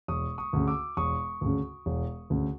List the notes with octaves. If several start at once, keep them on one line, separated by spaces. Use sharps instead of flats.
E1 C#6 D#6
C#6 D#6
D2 C#3
D6 E6
E1 C#6 D#6
D2 C#3
E1
D2 C#3